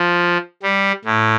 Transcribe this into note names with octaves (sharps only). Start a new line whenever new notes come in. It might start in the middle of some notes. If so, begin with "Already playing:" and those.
Already playing: F3
G3
A2